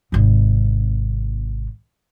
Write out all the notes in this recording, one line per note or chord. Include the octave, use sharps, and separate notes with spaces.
G#1 C3